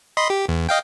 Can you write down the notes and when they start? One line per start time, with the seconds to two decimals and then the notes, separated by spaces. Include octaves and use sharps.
0.17 D#5 B5 C6
0.30 G4
0.49 E2
0.69 D#5 F5 G5